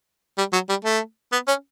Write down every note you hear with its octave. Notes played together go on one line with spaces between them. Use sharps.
G3
F#3
G3
A3
B3
C#4